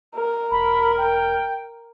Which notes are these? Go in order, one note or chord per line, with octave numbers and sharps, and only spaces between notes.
A#4
E1 B5
G5